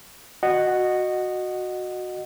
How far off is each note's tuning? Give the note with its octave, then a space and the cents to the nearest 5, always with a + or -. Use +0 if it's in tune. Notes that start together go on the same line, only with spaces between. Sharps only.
F#4 -10 D#5 -15 F#5 +0